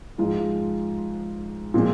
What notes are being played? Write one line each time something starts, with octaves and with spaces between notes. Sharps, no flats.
G#2 F3 G#3 F4
A#2 F3 G#3 C4